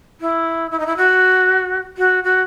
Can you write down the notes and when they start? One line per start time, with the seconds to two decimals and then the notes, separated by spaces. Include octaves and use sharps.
0.21 E4
0.71 E4
0.79 D#4
0.86 E4
0.97 F#4
1.98 F#4
2.24 F#4